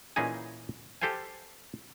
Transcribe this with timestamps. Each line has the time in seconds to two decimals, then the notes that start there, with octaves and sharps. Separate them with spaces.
0.16 A#2 E3 C#4 D#4 G#4 G#5
1.01 G4 A4 C5 F5 G#5